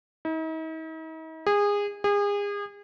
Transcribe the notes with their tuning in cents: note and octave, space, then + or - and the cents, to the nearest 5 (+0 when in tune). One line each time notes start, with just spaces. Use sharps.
D#4 +45
G#4 -25
G#4 -35